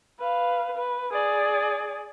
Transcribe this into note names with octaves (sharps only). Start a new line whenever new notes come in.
B4 F5
B4
G#4 D5